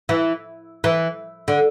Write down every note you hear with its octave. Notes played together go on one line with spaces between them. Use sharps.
E3
E3
D3